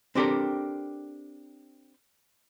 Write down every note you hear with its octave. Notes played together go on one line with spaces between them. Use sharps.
C4 D4 G4 A4 A#4